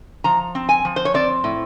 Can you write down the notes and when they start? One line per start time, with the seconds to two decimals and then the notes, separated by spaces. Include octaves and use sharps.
0.24 F3 A#5
0.55 C4
0.69 G#5
0.85 F3
0.96 C5
1.05 C#5
1.14 C4 D5
1.44 A2